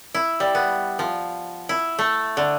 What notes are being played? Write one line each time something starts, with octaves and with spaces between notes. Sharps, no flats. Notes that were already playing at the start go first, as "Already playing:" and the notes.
E4
G3
B3
F3
E4
A3
D3